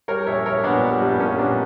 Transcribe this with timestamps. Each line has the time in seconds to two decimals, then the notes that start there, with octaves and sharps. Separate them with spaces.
0.08 G3 A#4 C#5
0.27 A#1 C#5 E5
0.46 A#1 A#4 C#5
0.64 A#2 B3 D4
0.83 G3
1.01 A#1 G3 B3
1.20 A#1 A#3 C#4
1.38 A#2 B3 D4